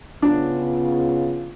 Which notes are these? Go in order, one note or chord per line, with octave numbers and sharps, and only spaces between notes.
C#3 B3 D4 F4